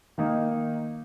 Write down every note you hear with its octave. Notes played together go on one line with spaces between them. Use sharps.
D#3 A#3 D#4